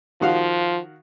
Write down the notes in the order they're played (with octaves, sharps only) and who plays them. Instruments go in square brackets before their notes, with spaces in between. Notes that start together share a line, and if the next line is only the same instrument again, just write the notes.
[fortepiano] D#3 F#4 F5 [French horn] F3